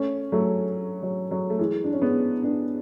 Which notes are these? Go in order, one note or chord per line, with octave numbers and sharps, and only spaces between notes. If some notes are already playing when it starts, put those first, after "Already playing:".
Already playing: A3 C#4
F#3 A3
F#3
F#3
A3
E3 G#3
D4
C#4
G#3 B3
B3 D4